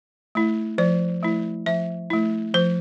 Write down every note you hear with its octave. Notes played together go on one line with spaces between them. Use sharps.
A3 E4
F3 D5
A3 E4
F3 E5
A3 E4
F3 C5